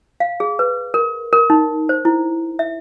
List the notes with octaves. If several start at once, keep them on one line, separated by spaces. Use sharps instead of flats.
F5
G#4
B4
A#4
A#4
D#4
C5
E4
E5